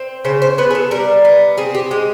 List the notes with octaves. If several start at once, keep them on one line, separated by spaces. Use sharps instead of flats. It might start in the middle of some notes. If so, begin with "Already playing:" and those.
Already playing: C4
C#3 C5
C5
B3 B4
G#4
A4
G3 A#4
B3
C4 G#4
G4
G#3 G4